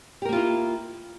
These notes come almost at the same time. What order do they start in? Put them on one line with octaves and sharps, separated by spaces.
G4 A#4 A#3 F4 E4